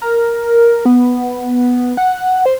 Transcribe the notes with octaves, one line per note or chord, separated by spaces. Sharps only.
A#4
B3
F#5
C5